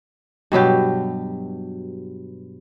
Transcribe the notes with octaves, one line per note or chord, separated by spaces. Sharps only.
G2 B2 F#3 G4